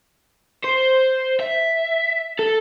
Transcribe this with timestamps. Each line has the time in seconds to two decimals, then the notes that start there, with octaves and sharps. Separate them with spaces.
0.64 C5
1.40 E5
2.39 A4